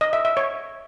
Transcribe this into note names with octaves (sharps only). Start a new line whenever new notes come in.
D#5
E5
E5
C#5